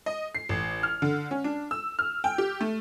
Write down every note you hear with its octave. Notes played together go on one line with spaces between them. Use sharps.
D#5
C7
A1
F6
D3
C#4
D4
E6
F6
G5
G4
A3